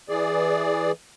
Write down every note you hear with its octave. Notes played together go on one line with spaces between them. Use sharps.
E3 G#4 D5